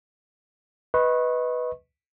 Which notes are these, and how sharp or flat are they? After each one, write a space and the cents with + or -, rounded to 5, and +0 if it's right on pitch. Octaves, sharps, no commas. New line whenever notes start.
B4 +0 D#5 +20 C#6 -30